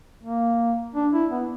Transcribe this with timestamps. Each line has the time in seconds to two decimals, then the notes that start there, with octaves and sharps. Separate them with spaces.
0.23 A#3
0.95 D4
1.13 E4
1.31 B3